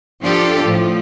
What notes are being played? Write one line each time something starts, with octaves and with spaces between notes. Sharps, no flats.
F3 D4 F4 G4 A4
A2 F3